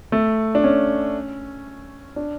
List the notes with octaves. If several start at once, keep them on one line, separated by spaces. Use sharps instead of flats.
A3
D4
C#4
D4